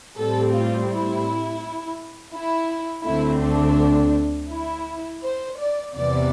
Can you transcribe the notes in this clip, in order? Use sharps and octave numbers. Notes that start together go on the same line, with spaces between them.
A2 G3 C4 A4
F4
E4
E4
D2 D3 A3 C4 E4
D4
E4
C5
D5
E2 C3 E3 B3 D5